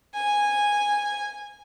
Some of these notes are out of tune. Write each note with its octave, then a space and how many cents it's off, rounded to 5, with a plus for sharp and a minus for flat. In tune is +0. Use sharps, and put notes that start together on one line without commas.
G#5 -10